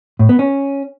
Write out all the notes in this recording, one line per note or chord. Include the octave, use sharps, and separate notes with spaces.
A2
B3
C#4